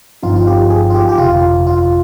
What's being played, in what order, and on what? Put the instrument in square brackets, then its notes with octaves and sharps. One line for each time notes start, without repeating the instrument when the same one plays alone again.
[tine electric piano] G1 G2 F3 C4 D#4 [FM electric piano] F4
[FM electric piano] F4
G4
G#4
F4
G4
G4
[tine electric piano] G1 F2 C3 [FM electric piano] F4
[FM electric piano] F4